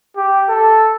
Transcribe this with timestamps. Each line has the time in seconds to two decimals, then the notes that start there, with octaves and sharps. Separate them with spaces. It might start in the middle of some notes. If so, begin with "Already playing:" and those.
0.17 G4
0.49 A4